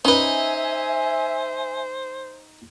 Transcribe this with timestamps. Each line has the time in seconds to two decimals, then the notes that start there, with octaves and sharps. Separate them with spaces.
0.05 C#4 D#4 B4 C5 D#5 E5 G#5